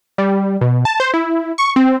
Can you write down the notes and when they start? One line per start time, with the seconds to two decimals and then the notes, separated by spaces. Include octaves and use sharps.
0.18 G3
0.61 B2
0.85 A5
1.00 C5
1.14 E4
1.58 C#6
1.76 C4